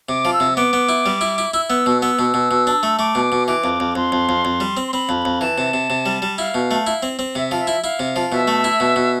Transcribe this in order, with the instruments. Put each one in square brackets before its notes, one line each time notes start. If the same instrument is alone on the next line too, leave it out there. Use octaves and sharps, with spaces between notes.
[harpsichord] C3 [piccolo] D6
[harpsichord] F3
[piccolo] E6
[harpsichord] C3
[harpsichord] B3 [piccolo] D6
[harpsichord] B3
E4
G3
E4
E4
[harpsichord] E4 [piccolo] E6
[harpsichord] B3 [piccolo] E6
[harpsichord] B2
[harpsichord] B3 [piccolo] E6
[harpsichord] B2
B2
B2
D4
A3
[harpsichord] A3 [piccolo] D6
[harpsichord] B2
B2
[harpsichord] E3 [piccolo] D6
[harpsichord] F2
F2
[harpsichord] F2 [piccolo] C6
[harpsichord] F2
F2
F2
G3
C4
[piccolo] C6
[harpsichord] C4 [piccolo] B5
[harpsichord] F2
F2
[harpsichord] E3 [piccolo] A5
[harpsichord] C3
C3
C3
G3
G3
[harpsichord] E4 [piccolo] F5
[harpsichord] B2
A3
E4
C4
C4
[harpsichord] C3 [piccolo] E5
[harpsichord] F3
[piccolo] E5
[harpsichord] E4
[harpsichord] E4 [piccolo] F5
[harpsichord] C3
F3
[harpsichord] B2 [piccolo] E5
[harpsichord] A3
E4
B2
B2